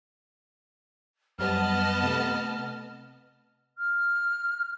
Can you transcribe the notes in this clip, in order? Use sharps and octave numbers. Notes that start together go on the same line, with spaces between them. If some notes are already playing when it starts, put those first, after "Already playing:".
F#2 G3 B3 D#5 A5 F6
C3 A3
F6